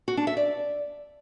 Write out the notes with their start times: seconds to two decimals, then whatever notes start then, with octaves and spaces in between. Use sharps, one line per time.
0.08 F#4
0.17 D4
0.27 E5
0.37 D5